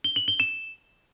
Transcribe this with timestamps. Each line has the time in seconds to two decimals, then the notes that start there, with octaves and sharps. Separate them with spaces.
0.04 G7
0.16 F#7
0.28 G7
0.40 E7